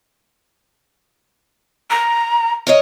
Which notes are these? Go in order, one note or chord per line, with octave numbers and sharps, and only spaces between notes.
A#5
A#4 C#5 D#5